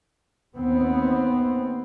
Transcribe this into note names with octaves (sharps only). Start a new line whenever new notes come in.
D#2 B3 C4